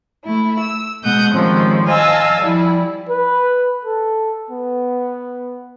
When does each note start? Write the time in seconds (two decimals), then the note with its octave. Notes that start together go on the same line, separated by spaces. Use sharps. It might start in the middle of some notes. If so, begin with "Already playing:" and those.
0.24 A3 E4
0.59 E6
1.03 B2 G#3 F#5 D#6 G6
1.33 D#3 F3 G3 G#3 C4 C#4
1.86 D#5 F5 G#5 A5 E6
2.39 F3 G3 E4
3.09 B4
3.85 A4
4.51 B3